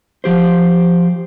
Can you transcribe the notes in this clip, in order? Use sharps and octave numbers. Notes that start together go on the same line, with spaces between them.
F3 G4 C5